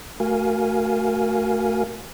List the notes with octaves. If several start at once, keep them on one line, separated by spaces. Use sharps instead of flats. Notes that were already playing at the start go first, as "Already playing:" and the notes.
A3 F#4 A#4 F5 G#5